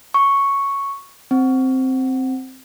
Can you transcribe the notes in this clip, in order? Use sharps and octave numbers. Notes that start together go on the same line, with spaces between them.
C#6
C4